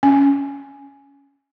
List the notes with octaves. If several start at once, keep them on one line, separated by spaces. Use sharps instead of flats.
C#4